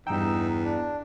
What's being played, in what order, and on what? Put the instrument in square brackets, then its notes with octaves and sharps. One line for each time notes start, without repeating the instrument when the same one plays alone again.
[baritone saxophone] E2 [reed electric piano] G2 G5 [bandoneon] D#4 E6
[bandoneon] D4